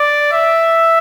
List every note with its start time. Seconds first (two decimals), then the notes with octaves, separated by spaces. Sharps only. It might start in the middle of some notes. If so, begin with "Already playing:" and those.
Already playing: D5
0.32 E5